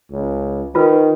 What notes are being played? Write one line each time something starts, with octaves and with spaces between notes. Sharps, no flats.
C#2
D#3 F4 B4